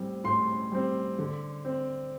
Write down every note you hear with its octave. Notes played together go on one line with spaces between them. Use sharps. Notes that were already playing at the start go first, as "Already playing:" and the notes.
Already playing: A2 G3 C4
A2 C6
G3 C4
D3
C4